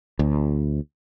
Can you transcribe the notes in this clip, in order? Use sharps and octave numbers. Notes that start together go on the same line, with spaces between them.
D2